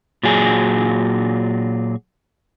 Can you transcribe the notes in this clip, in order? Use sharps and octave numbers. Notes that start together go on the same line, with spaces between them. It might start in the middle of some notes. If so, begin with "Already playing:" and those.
A#2 F#3 G#4